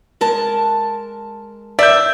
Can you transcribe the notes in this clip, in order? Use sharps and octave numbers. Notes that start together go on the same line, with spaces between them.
G#3 A#4 A5
D5 E5 G6